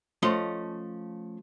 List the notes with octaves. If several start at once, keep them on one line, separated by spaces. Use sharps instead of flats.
F3 A3 C#4 D#5 C6